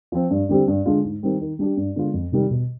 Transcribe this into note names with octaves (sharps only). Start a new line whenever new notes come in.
F3 C4
G2
D3 G3 C4 G4
G2
D3 G#3 D4 F4
G#2
D#3 G3 C4
D#3
G3 D4 G4
G2
D3 G#3 B3 F4
F2
C3 D#3 G3
B2